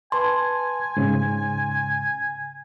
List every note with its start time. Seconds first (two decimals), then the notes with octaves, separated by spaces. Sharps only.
0.12 B4 G#5 A5 C6
0.97 G#2 C#3